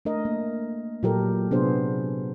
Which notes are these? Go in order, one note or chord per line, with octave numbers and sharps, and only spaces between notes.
A3 D4 A#4 D#5
A#3
A#2 F#3 G4 A4 A#4
C3 B3 D4 G#4 C5